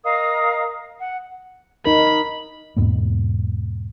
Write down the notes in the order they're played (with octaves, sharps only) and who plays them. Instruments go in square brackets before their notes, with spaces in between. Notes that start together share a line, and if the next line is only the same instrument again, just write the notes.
[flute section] A#4 D#5 F5 D#6
F#5
[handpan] D#4 A#4 [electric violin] B5
[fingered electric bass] E2 G#2 B2 A#3